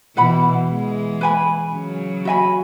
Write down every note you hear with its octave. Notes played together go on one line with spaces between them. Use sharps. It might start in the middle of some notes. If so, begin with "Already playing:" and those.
B2 E3 B4 F#5 B5
E3 G#3
B4 G#5 B5
C#3 F#3
F#4 E5 G#5 B5